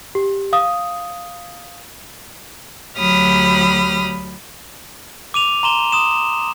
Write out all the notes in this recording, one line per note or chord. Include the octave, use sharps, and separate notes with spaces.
G4
F5 D#6
D2 F#3 G4 B5 D#6 F6
D6 D#7 F7
A#5 C6 E7 G7
C6 D#6 E7